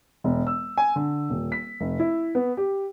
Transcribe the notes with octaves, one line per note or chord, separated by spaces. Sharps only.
E1
E6
G#5
D3
D#1
B6
F1
E4
B3
G4